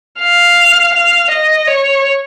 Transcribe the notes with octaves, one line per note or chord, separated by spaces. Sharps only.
F5
F5
D#5
C#5